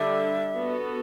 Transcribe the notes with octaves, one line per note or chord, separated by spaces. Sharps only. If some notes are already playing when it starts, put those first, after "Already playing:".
Already playing: D3 G3 D4 A4 E5
B3 F#4 A4